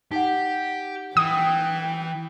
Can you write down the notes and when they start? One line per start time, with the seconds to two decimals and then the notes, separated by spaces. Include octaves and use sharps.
0.12 D#4 G4 F#5
1.17 E3 G5 D#6